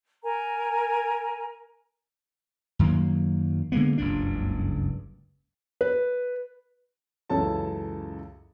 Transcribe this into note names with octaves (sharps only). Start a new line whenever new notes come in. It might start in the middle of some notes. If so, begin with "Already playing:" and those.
A#4 G#5 A#5
F#2 D#3 F#3 A#3
D3 G#3 A#3 B3
F#1 C#2 G2 D4
B4
C#2 F#2 E3 A4 C#5 A5